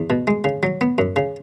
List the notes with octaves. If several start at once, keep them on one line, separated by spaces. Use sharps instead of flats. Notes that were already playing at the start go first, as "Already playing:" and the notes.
Already playing: E2
B2
G#3
C#3
F#3
B3
F#2
C#3